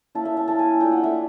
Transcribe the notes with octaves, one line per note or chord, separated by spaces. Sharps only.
A#3 C#4 E4 A5
E5
A5
A#3 C#4 E4 A5
G#5
A3 D4 F4 G5
F#5
E5